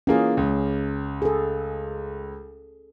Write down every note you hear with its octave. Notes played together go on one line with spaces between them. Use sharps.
E3 A#3 C#4 F4 G#4
C#2
G#4 A4